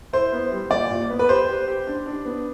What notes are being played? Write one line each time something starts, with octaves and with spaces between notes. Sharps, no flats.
E4 C5
B3
G3
A#2 D5
A#2
B3
B4
G4 C5
G4
G4
D4
D4
B3